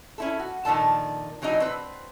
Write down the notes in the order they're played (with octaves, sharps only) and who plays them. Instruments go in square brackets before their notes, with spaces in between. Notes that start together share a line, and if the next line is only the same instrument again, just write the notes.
[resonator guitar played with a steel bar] C#4 E4 A4
F#4
A#2 D#3 F3 D4 A4 A5
E3 F#3 D4 D#4 D#5
C4 B4